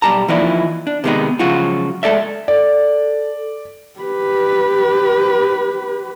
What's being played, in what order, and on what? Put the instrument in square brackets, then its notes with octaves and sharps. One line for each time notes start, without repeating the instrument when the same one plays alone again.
[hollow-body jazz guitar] B1 D#3 G3 G4 A5 A#5
E3 F3 A#3 D#4 E4 D5
D4
C3 D#3 G#3 A#3 B3 D#4
C#3 F3 F#3 G#3 F4 F#4
G#3 A4 D5 E5
[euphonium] A4 [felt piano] D5
[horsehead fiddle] G4 B4